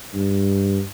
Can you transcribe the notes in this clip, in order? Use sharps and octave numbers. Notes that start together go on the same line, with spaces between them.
G2